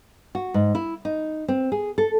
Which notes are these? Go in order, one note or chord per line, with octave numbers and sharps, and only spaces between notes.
F#4
G#2
E4
D#4
C4
G#4
A4